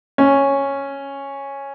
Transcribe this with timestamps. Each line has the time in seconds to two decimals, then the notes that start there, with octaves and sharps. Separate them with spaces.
0.18 C#4